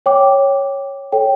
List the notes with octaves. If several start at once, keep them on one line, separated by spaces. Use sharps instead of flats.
C#5 G5 D6
A4 C#5 G5